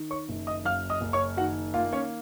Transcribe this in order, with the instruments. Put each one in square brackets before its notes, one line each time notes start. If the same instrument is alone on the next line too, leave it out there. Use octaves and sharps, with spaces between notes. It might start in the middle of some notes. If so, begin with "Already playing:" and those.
Already playing: [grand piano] D#3
C#5 C#6
F#1
D#5 D#6
F#2 F5 F6
D#5 D#6
F#1
C#5 C#6
D#3 F#4 F#5
A#3 F4 F5
C#4 C#5